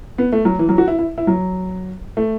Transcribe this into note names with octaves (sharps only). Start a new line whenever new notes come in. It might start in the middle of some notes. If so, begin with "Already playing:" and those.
B3
A3
F#3
E3
F#3
F#4
E4
E4
E4
F#3
A3